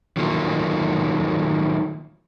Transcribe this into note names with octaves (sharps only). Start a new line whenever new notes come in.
D#3 F3 F#3 A3 A#3